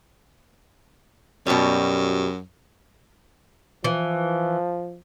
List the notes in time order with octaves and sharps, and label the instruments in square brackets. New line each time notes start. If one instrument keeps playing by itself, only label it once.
[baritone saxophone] F#2 [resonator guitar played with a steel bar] B2 G3
[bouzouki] E3 [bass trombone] F3